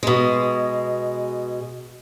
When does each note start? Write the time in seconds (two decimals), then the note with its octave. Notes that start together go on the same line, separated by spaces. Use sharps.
0.03 B2 G#3